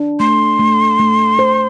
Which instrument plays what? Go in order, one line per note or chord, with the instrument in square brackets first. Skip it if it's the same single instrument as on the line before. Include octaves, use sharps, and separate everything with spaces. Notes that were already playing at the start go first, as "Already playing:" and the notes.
Already playing: [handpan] D4
[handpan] A3 [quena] C6
[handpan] A3
A3
C5